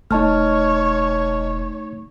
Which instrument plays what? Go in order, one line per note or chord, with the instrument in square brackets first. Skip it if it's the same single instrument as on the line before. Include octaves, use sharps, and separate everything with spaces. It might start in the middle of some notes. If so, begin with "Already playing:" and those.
[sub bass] E1 [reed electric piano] A3 D#4 [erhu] C#5 [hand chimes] D#5 A5 F6